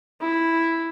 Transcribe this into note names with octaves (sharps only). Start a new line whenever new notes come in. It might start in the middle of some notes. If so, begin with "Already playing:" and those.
E4